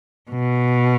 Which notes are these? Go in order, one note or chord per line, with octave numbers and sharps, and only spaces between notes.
B2